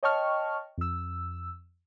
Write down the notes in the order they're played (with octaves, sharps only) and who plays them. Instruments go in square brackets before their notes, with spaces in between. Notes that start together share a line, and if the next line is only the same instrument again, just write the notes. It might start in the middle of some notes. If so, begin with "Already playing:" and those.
[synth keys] C#5 D#5 G5 A5 C#6 F6
F2 E6